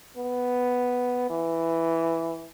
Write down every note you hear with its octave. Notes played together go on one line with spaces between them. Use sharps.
B3
E3